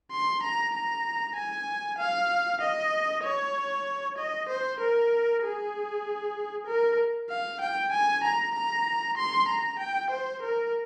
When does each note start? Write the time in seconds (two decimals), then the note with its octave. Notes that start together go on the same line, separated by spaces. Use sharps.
0.11 C6
0.43 A#5
0.74 A#5
1.36 G#5
1.98 F5
2.61 D#5
3.23 C#5
4.18 D#5
4.49 C5
4.80 A#4
5.43 G#4
6.67 A#4
7.30 F5
7.61 G5
7.92 G#5
8.24 A#5
8.55 A#5
9.17 C6
9.48 A#5
9.79 G5
10.10 C5
10.42 A#4